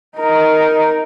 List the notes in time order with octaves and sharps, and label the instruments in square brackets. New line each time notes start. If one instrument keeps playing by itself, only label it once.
[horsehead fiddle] D#4 A#4